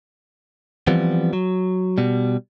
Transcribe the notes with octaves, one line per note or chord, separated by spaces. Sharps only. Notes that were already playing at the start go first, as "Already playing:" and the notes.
E3 F3 G3 B3 C4
F#3
B2 G3